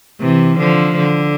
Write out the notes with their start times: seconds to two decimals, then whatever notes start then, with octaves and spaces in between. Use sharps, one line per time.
0.20 C3 E3
0.58 D3 F3
0.97 D3